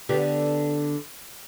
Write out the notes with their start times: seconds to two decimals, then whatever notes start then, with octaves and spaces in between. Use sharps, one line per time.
0.09 D3 B3 G4